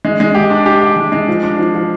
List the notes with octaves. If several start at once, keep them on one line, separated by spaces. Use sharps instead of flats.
G#3
G#3
G4
D4
G4
G4
G#3
G#3
F3
D4
F3
F3